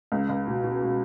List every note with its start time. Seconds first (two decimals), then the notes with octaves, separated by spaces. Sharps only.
0.12 C#2
0.29 C#2
0.47 B2
0.64 B2
0.81 B2